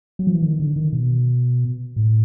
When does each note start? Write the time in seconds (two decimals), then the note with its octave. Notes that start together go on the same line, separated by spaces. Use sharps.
0.19 F#3
0.27 F3
0.34 E3
0.42 D#3
0.60 D3
0.76 D#3
0.93 B2
1.96 A2